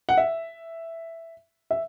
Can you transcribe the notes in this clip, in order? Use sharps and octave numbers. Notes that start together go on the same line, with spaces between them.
F#5
E5
E5